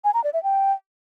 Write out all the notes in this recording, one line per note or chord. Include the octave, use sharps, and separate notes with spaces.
G#5
A#5
D5
E5
G5